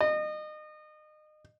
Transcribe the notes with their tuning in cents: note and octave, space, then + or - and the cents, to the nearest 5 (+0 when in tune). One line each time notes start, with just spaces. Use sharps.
D#5 -30